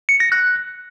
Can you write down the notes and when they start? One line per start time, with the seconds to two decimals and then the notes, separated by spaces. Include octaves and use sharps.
0.09 C#7
0.20 A#6
0.32 F#6